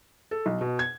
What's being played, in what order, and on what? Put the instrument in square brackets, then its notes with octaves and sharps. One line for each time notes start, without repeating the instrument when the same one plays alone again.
[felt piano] A4
B1
B2
G#6